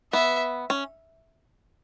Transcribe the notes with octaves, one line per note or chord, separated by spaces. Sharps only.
B3 E5
C#4